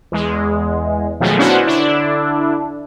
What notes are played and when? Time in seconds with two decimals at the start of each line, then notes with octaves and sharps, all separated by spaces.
0.12 E2 G#3
1.20 B2 D#3 F3 F#3 G#3 A3
1.38 B3 C#4 D4 E4 F#4 C5
1.67 D3 D4 E4